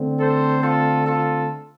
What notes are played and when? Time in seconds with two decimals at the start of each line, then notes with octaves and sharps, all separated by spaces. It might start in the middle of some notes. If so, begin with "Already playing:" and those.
Already playing: D3 A3 C4
0.20 A4 C5
0.63 F4 A4
1.06 F4 A4